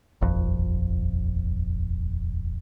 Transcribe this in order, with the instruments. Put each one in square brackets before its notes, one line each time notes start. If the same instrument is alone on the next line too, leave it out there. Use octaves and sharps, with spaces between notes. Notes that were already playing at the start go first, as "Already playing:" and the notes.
[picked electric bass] D#1 G#1 F2